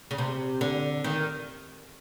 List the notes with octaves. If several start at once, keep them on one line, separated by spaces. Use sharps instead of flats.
C#3
C3
D3
D#3